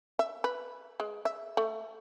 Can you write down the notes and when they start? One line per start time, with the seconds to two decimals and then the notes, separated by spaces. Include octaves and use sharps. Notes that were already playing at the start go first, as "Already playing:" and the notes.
0.19 E5
0.44 B4
1.00 G#3
1.25 E5
1.57 A3